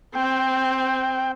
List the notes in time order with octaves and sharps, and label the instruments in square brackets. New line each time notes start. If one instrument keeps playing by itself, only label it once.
[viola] C4 [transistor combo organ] G5